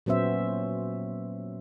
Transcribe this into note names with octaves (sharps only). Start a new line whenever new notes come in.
A#2 F#3 B3 C#4 C5 E5